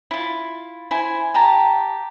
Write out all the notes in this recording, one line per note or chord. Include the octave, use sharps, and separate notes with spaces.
E4 F4
E4 C5 G#5
G4 G5 A5 A#5